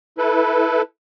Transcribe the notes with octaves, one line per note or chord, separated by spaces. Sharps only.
E4 A4 B4